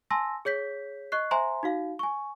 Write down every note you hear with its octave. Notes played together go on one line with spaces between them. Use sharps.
G#5 A5 C6 E6 A#6
G#4 C#5 G6 B6
D#5 C#6 F#6 C7
C5 E5 G#5 A#5 C6
D#4 F#4 F5
G#5 C#6